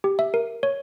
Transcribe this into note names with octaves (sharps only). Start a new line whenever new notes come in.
G4
E5
A#4
C#5